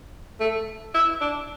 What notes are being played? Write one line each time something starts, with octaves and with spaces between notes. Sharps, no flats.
A3
E4
D4